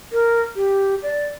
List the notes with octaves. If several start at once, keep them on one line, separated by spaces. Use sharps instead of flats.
A#4
G4
D5